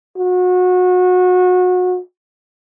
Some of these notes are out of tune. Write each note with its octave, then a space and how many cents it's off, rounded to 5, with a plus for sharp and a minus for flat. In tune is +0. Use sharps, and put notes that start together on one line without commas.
F#4 -30